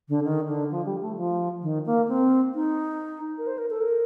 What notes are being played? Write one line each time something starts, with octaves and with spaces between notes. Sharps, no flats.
D3
D#3
D3
F3
G3
A3
F3
D#3
A#3
C4
D#4
A#4
C5
A#4
A4
A#4